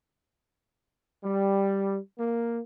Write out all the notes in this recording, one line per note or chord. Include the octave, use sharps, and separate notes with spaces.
G3
A#3